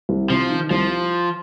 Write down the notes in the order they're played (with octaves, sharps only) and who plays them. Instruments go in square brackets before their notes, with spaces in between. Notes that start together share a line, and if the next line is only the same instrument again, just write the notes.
[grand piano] C2
[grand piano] C3 [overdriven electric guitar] F3
[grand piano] D#3
[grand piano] C2 [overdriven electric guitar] F3